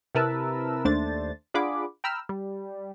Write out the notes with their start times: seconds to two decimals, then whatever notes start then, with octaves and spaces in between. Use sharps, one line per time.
0.15 C3 E4 A#4 B4 A5 E6
0.85 D#2 A3 D4 C5 A6
1.54 D4 F4 G#4 F#5 B5 D6
2.04 G5 A#5 B5 E6 F6
2.29 G3